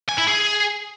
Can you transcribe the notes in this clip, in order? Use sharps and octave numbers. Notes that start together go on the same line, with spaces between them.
G#5
E4
G#4